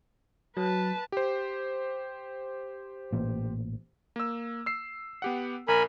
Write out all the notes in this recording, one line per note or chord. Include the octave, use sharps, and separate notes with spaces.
F#3 B4 A5
G4 C5
A1 A#2
A#3 E6
E6 C7
B3 G4 F#5
A#1 A#4 G#5 B5